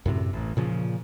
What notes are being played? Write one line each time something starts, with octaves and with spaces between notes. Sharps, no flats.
F#2 A2 C3
A1
A#2 C#3 F3